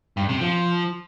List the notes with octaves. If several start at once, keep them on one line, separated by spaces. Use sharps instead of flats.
G2
C3
F3